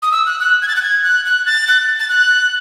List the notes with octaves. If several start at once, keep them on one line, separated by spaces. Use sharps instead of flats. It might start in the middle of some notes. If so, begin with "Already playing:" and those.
D#6
E6
F#6
F#6
G#6
A6
F#6
G#6
F#6
F#6
A6
F#6
A6
F#6